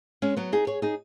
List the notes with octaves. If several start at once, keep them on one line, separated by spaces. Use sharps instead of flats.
G#3 C#4
F#3 B3
D#4 G#4
G#4 C#5
D#4 G#4